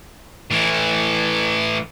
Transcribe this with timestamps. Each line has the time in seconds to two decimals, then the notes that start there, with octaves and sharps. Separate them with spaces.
0.51 A2 E3